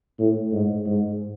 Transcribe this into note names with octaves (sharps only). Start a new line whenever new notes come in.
A2
G#2
G#2